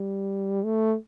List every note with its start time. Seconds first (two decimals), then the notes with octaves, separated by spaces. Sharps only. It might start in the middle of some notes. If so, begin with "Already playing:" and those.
Already playing: G3
0.64 A3